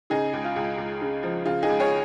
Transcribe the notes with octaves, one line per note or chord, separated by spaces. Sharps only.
C#3 D#4 G#4
C#2
F4
C#2
C#2
C#3
F3
C#3 F4
D#4 G#4
C#2
G#4 C#5